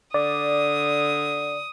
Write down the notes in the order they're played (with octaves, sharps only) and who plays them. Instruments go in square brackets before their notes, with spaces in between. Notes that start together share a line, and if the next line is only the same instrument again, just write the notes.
[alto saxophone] D3 [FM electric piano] D5 [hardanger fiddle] D#6